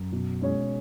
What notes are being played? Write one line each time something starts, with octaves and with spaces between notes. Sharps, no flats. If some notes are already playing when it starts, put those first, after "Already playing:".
Already playing: F#2
B2
G#3 C#4 G#4 C#5